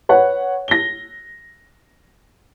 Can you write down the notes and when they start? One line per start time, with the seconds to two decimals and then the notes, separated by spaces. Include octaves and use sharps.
0.09 B4 C#5 F#5
0.68 A#6 G7